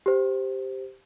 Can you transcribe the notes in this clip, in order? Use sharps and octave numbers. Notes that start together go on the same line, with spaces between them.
G4 C5